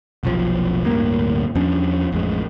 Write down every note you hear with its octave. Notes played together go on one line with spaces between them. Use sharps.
F1 B1 F3
D1 D2 G2 A#3
E2 F3 C#4 D4
A1 F2 G#3